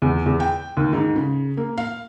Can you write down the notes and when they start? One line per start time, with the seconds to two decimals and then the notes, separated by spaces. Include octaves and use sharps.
0.02 E2
0.26 E2
0.40 G5
0.77 D#2
0.93 G#2
1.16 C#3
1.57 A#3
1.78 F5